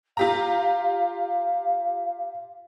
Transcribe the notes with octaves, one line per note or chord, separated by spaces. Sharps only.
F4 G4 F5 A#5